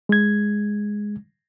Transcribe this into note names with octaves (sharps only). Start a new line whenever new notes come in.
G#3 G#6